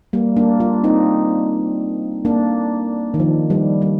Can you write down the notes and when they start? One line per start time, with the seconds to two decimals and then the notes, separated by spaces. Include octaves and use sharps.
0.13 G3 A#3
0.37 A#3 D4
0.60 D4 F4
0.84 C4 D#4
2.25 A#3 D4
3.14 D#3
3.20 F3
3.50 G3
3.82 G3